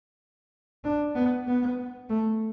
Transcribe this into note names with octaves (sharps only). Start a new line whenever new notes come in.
D4
B3
B3
A3